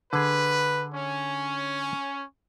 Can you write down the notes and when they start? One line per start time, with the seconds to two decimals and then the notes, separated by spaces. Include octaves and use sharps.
0.13 D3 G#4 B4
0.95 C#4